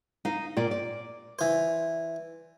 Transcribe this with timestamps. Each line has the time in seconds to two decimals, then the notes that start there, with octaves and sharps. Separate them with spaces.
0.25 D#4 F5
0.57 A#2 F4 D5
0.71 D5
1.39 E3 C5